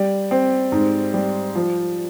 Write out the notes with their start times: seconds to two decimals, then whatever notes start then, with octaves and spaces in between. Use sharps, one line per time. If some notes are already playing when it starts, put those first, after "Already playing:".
Already playing: G3
0.31 C4
0.72 G#2
1.14 G3
1.55 F3